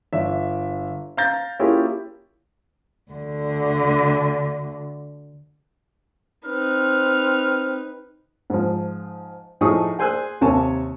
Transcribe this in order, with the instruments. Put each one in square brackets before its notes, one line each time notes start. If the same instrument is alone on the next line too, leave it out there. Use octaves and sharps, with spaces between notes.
[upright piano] G1 D5 E5
F5 A#5 G6 A6 A#6
A#3 C#4 E4 F4 G4 G#4
[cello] D2 D3
[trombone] C4 [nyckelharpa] D#4 B4 [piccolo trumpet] F6
[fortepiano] G#2 F3
A2 F3 D#4 G#4 C#6 D#6
G#4 C5 G#5 E6 F#6
D#2 C3 C#5 G#5 A5 C#6